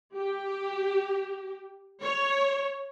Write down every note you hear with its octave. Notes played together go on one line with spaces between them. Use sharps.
G4
C#5